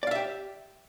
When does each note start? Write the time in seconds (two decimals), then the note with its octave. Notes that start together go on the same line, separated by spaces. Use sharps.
0.03 D5
0.07 F5
0.11 E5
0.15 G4